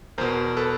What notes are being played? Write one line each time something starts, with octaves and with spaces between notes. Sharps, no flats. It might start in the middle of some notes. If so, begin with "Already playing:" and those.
E2 B2 A#4 C5
A4 B4